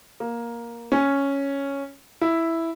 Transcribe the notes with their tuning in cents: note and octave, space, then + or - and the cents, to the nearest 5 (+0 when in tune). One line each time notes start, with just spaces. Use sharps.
A#3 +10
C#4 +0
E4 +0